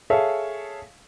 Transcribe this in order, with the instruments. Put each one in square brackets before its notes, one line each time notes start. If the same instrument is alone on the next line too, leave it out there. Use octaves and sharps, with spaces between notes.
[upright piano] G#4 A4 C#5 E5 F5